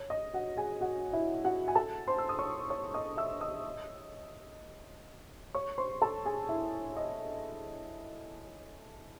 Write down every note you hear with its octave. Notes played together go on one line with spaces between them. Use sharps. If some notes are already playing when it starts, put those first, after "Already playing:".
Already playing: C#5
D#5
F#4 F#5
G#4 G#5
F#4 F#5
E4 E5
F#4 F#5
G#5
A4 A5
C5 C6
E6
D#6
C#5 C#6
C#5 C#6
D#5 D#6
E5 E6
D#5 D#6
C#5 C#6
C5 C6
A4 A5
G#4 G#5
E4 E5
D#5